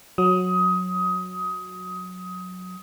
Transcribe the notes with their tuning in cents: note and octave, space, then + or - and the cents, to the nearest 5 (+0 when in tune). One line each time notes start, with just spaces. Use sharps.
F#3 -15 D#6 +20